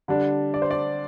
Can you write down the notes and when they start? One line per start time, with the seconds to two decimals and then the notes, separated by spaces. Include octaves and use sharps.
0.08 D3 G3 D4
0.54 D5
0.62 C5
0.71 D5